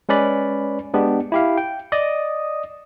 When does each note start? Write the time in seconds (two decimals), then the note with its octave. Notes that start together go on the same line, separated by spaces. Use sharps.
0.09 G#3 C#4 B4 D5 B5
0.94 G#3 B3 D4 G4
1.32 E4 G4 F5
1.57 G5
1.92 D5 D#5 D#6